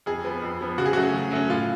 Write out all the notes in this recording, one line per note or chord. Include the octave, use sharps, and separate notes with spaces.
F2 G#4
F3 B3
F2
F3 B3
C#3 F#4
G#4
F#3 A3 C#4 F#4
C#3
F#3 A3 C#4
A2 F4